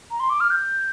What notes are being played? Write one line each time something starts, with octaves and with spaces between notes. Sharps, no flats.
A#5
C6
D6
F6
G6